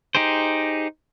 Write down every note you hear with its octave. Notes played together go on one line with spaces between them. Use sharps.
D#4 G4 G#4 C5